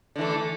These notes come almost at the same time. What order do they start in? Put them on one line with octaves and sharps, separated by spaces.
D3 E3 A3